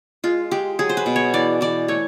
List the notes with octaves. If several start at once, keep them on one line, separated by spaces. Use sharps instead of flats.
G#3 F4
G#3 G4
F#3 G#4
C5
B4
B2
C#5
E3 D5
E3 D5
A3 C#5